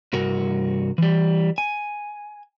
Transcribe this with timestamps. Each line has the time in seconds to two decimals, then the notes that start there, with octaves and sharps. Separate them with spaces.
0.13 C2 G2 F#4 A#4
0.98 E3 G3
1.58 G#5